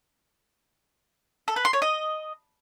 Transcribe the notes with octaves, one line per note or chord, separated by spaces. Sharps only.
A4
B4
C6
C#5
D#5